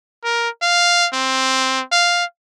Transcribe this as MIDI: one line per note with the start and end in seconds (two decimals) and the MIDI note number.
0.24 0.49 70
0.62 1.08 77
1.14 1.82 60
1.92 2.25 77